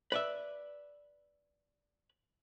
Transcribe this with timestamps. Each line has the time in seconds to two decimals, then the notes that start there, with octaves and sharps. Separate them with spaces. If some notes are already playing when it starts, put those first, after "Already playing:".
0.12 B4 D5 E5